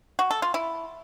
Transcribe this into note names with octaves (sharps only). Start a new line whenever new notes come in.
F#4
A4
F4
E4